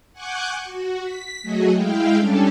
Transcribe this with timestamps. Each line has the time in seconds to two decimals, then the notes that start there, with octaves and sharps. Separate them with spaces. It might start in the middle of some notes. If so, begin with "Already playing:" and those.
0.13 F#5 G#5 C#6 D6 F#6 G6
0.64 F#4
1.02 B6
1.42 F#3 A3 F#4 G#4 D#5
1.72 G#3 E4 F5 G5
2.17 G3 C#4 D4 G4 A4